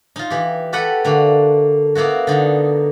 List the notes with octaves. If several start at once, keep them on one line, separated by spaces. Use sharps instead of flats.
D#4 F4
E3 G4
F#4 G4 A4 B4 F#5 G5
D3 A3 A#3
A#3 B3 E4 F#4
D3 D#4